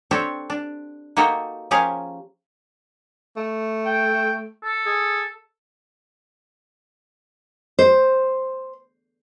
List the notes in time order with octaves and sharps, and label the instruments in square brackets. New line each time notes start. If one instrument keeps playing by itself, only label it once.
[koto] C4 D4 G4 A4 C5 C#5
D4
A#3 D#4 F#4 G4 A4 D#5
F3 C#4 G4 G#4 A#4 F5
[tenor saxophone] A3
[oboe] G5
A4
[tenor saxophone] G#4
[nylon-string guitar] C5